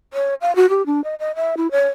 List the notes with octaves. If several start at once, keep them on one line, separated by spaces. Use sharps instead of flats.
C#5
F5
F#4
G4
D4
D#5
D#5
E5
E4
C#5